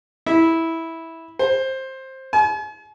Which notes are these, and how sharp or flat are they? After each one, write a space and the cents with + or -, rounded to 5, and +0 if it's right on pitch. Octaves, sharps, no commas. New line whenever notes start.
E4 -10
C5 +15
G#5 +45